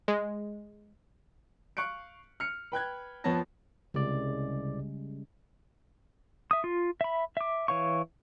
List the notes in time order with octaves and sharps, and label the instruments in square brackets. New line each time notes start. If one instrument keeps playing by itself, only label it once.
[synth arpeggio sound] G#3
[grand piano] F5 C#6 F#6 C#7 D7
F6 C#7
B4 G5 F#6 G#6
F2 F3 B3 C#5 A5 A#6
[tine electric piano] C2 D5 [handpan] C#3 G3 G#3
[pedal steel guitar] E5 D#6
F4
E5 B5
E5 D6
E3 C#5 F5 C#6